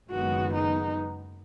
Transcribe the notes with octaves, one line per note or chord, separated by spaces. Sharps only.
F#1 F#2 D#3 G#3 B3 F#4
D#4